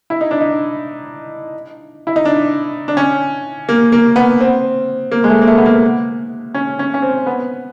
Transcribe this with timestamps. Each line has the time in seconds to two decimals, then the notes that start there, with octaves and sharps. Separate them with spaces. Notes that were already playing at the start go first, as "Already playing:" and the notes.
0.10 E4
0.21 D#4
0.31 D4
0.41 D#4
2.07 E4
2.16 D#4
2.25 D4
2.88 D4
2.97 C#4
3.69 A#3
3.92 A#3
4.16 B3
4.41 C4
5.11 A#3
5.24 G#3
5.29 A3
5.41 A#3
5.47 A3
5.57 B3
5.66 A#3
6.55 C#4
6.79 C#4
6.94 C#4
7.02 C4
7.26 B3